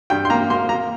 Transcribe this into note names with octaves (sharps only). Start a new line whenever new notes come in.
G2 G5
C6
A#3 A#5
A#3 C6
A#3 A#5